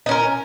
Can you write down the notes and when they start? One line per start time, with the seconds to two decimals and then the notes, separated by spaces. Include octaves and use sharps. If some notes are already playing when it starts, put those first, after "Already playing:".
0.06 D#4
0.09 C#4
0.11 A#4